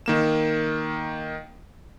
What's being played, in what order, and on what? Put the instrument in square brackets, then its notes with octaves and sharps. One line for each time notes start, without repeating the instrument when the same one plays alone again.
[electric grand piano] D#3 A#3 E7